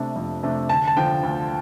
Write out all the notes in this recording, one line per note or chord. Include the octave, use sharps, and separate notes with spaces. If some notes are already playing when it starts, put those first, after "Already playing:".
Already playing: C3 A3 D4
F2
C3 A3 D4
D2 A5
A5
D3 F3 G5
D2